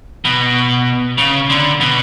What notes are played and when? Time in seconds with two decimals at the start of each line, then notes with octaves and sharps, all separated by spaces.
0.25 B2
1.18 C#3
1.50 D3
1.80 B2